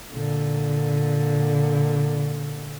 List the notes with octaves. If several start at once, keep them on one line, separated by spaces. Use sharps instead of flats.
A#2 D3